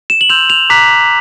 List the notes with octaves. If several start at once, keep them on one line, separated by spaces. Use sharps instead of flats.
E7
F#7
C6 E6 G6 F7
F7
A#5 D6 F#6 B6